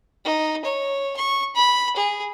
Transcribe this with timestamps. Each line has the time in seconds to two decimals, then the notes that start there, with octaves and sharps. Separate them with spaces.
0.25 D#4
0.64 C#5
1.16 C#6
1.55 B5
1.96 G#4